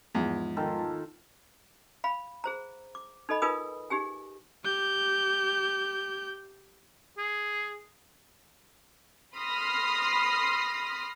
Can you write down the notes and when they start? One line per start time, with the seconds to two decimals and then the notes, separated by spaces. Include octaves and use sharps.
0.15 E2 G#2 F3
0.57 D#3 F4 A4
2.04 F5 B5
2.44 G#4 C5 A#5
2.95 D6
3.29 D#4 A4 D#5 B5
3.42 D#4 F4 A#4 B4 G#5 D#6
3.90 D#4 G4 G#4 G#5
4.64 G4 G6
7.18 G#4
9.35 B5 C6 D#6 F6 A#6 C7